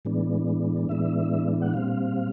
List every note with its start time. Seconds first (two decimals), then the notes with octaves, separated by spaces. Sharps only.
0.05 A2 E3 G#3 B3 D4
0.89 A2 E3 G#3 B3 D4 E5
1.62 F#5
1.73 A#2 G3 C4 F5